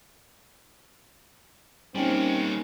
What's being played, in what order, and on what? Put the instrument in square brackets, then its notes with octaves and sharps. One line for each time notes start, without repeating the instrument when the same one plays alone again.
[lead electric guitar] G3 A#3 [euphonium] C4 [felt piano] C#4 D#4